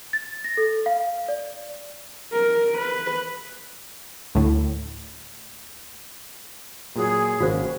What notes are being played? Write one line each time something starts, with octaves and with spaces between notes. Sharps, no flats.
A6
A#6
A4
F5
D5
A#4
B4
D2 A2
A#2 F#3 G#4
G#1 C#3 A#3 F#4 C5